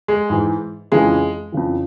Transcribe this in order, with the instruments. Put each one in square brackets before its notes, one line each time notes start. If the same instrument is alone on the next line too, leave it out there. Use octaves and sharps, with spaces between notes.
[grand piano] G#3
G#2 E3
F2 C#3 E3 G#3
F2 C#3 E3